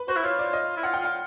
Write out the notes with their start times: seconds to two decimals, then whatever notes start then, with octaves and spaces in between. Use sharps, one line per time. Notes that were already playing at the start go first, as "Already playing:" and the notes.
Already playing: B4
0.08 F#4 C5
0.16 E4
0.24 F4 C#5
0.39 D5
0.53 D#5
0.76 E4
0.83 F4 F#5
0.94 G5
0.99 F4
1.04 F#5